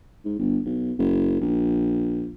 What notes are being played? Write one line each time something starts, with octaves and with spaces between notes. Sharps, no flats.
G#2
G1
B1
F#1
A#1